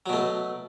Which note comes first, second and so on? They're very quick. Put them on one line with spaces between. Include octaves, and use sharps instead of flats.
F#3 B2 A3